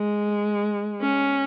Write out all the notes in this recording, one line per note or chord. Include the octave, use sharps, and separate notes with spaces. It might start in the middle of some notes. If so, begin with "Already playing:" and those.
Already playing: G#3
C#4